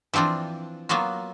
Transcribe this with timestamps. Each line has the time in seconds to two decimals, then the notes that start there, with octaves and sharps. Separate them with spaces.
0.14 E3 F3 C4 D4 F4
0.89 F#3 A#3 B3 F4 F#4